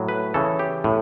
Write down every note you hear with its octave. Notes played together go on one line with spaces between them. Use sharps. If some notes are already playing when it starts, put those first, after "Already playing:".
Already playing: A2 F#3
B4
C#3 E3 A4
G4
A2